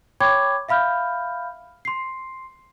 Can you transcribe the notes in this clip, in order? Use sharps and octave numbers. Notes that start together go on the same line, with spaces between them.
C#5 G5 B5 C#6 D6 G#6
E5 F5 B5 F6 G6
C6 C7